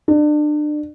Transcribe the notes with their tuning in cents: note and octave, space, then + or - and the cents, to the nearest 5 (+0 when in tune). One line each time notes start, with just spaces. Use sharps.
D4 +30